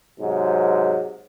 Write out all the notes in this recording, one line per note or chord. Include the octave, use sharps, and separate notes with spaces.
G#2 C3 F#3